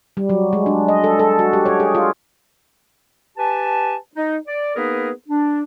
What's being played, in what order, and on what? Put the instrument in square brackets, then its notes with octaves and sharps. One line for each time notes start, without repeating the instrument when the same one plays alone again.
[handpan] G3
F#3
G#3
D4
D#5
A4
A4
F#4
G4
C#5
G#4
F4
[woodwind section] G4 B4 G#5 A5
D#4
D5
A#3 B3 D#4 G#4 A#4 B4
D4